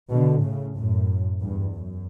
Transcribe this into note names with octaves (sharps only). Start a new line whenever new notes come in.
B2 D3
A2 C#3
F#2 A2
E2 G2
F#2